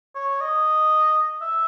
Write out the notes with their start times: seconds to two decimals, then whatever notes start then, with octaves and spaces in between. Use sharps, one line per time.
0.15 C#5
0.41 D#5
1.42 E5